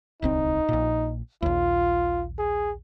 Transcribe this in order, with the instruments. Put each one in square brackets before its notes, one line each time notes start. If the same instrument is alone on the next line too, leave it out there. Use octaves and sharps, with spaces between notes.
[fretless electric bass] D1 C2 C4 [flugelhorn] D#4
[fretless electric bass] A#1 A#2
[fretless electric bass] A#1 D#2 [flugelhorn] F4
[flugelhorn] G#4